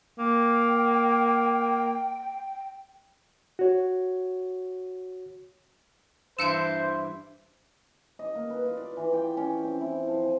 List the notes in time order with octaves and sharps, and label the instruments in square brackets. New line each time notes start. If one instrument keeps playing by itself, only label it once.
[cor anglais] A#3 [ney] G5
[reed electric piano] F#4 C#5
[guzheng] G2 E3 [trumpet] C5 [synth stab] E6 C#7 D7
[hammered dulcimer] D#5
A#3
B4
F4
D5
E3
G5
C#4
C4
E4
F3
G#5